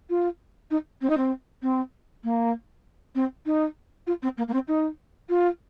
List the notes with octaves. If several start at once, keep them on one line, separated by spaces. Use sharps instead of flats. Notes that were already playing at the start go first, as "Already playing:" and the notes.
F4
D#4
C4
D#4
C4
C4
A#3
C4
D#4
F4
C4
A#3
A#3
C4
D#4
F4